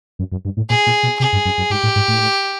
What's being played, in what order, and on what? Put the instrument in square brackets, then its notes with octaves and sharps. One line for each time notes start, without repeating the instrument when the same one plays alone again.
[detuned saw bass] F#2
F#2
G2
A2
[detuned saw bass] A#2 [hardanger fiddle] G#4
[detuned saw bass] A#2
B2
[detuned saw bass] C3 [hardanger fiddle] G#4
[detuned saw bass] G2
F#2
F#2
[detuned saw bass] G#2 [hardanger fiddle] G4
[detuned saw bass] A2
G#2
A2